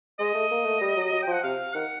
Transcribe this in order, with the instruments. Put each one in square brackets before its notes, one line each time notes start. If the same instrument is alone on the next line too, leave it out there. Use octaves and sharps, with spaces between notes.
[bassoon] G#3 [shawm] D#5
[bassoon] A3
A#3
A3
G3
F#3
F#3
[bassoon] F3 [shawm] G5
[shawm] F#5
[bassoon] C3 [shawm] F5
[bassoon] D#3 [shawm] F#5